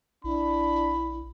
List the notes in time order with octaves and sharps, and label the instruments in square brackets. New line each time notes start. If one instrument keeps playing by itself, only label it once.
[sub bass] A#1 [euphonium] D4 [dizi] E4 [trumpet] B5